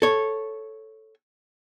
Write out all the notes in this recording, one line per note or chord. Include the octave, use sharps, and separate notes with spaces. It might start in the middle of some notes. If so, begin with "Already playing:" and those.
A4 C#5